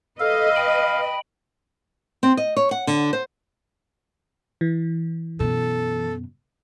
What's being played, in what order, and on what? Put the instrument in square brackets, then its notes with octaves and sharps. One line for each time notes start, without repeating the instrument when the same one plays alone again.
[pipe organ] A4 [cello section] B4 D#5 [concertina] F5
[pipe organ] G5 B5
[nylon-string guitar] C4
D#5
C#5
F#5
D3
C5
[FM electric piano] E3
[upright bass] F#2 B2 [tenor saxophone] A4